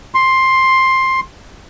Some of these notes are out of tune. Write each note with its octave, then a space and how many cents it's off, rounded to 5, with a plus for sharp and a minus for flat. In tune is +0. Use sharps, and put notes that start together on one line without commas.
C6 +10